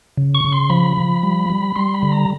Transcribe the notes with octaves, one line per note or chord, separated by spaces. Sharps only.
C#3
C#6
C#3
C6
F3 B5
F3
G3
G3
G3 C6
B5
D3
A#5